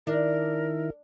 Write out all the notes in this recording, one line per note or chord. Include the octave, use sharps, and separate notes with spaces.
D#3 D4 E4 A#4